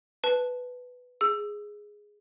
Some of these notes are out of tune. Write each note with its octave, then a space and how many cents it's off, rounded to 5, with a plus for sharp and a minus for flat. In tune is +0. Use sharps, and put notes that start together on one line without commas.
B4 +5 A5 -10
G#4 +0 E6 +20